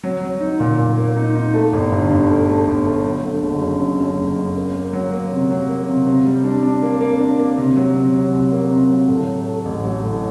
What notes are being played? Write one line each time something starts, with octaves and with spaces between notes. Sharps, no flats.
F#3
F#3
D#4
A#2
A#2
A#3
D#4
D#4
A3
G1
G2
G2
A3
A3
G1
A3
F#3
D3
F#1
F#2
F#2
F#2
F#1
F#2
A#3
A#3
F#3
A#3
C3
F#3
A#3
C3
C3
G3
D4
D4
A#3
A#3
D4
A#3
C3
F#3
C3
F#3
C2
A#3
C3
F#3
A2
A2
A3
A1
F#3
A2